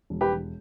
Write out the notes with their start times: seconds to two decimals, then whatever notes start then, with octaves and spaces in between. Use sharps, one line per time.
0.10 E1
0.21 G4 B4
0.32 E1